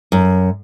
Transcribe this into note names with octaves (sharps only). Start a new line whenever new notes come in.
F#2